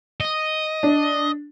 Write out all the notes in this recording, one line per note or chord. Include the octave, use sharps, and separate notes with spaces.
D#5
D4